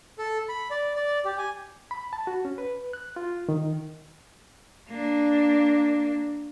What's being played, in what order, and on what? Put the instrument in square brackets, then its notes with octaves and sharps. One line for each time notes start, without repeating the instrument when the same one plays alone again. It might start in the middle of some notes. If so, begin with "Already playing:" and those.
[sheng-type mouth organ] A4
B5
D5
D5
G4
G#5
[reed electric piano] B5
A5
F#4
C#4
B4
F#6
F4
D#3
[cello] A#3 D4